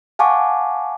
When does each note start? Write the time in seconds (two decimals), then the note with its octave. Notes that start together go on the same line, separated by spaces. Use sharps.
0.19 F5 F#5 G#5 A5 C#6 D6